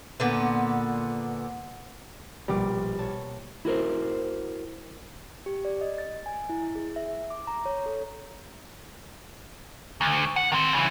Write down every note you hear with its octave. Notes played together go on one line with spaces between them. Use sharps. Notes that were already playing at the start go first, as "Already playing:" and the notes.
A#2 D3 B3
A#1 B2 G3 D6
C#5 A5
E4 F#4 A#4 C5
G4
D5
D#5
A6
G#5
E4
G#4
E5
D6
A#5
C#5
A4
D2
F#5
D#3 C4
C#3 E3